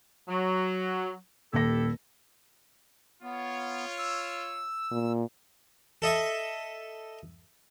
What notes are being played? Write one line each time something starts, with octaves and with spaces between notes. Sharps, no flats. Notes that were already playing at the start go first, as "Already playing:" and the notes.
F#3
D#1 D#2 E4 G4 A4 A#6
B3 F4 C#5
E6
A#2
A4 D#5 E5